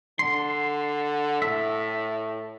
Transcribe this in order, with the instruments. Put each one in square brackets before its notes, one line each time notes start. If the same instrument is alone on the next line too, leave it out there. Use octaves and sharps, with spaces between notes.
[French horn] D3 [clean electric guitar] C6
[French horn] A2 [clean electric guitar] E5